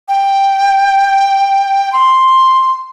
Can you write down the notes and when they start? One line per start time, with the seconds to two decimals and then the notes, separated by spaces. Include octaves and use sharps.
0.08 G5
1.93 C6